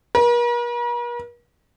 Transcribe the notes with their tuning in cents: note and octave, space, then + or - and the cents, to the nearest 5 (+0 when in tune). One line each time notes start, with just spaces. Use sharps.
A#4 +45